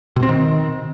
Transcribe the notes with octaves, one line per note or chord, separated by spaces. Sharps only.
B2
C4
D#3